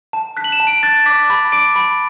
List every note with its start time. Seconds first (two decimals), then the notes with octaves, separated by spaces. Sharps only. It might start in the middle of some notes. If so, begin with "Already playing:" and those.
0.13 A5
0.37 F#6 B6
0.44 F#7
0.52 E7
0.60 A5
0.67 D7
0.83 F#6 A6
1.06 D6 B6
1.30 B5
1.52 D6 D7
1.76 B5